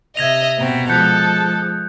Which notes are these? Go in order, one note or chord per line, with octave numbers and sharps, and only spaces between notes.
C3 D#5 E5 G#6 A#6 F7
B2 C4 A#5
F3 G#3 A4 F#6 G6 C#7